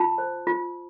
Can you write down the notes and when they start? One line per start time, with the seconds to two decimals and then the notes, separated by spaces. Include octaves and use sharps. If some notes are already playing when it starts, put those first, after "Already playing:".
Already playing: F4 A5
0.18 C5
0.47 F4